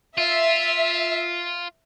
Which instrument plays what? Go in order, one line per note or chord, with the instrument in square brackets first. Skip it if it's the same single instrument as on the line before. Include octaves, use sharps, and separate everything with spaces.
[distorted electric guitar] F4 [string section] E5